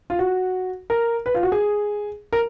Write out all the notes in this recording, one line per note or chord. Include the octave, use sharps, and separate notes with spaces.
F4
F#4
A#4
B4
F4
F#4
G#4
A#4